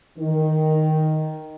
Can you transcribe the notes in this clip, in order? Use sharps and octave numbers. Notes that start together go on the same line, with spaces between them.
D#3